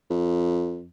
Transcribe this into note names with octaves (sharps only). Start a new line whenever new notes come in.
F2